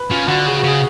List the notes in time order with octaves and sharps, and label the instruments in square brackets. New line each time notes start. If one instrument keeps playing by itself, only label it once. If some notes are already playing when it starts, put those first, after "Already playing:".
Already playing: [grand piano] B4
[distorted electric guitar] C#3 [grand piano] F4
[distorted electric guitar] D3 [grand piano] F#4
[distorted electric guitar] C#3 [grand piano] G#4
[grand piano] F#4
[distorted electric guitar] C#3 [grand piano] G#4